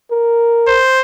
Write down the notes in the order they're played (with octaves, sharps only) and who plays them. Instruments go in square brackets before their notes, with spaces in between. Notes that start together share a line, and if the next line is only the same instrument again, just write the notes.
[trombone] A#4
[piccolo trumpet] C5